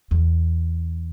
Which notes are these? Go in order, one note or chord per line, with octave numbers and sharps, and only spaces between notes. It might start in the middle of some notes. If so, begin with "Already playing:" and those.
E2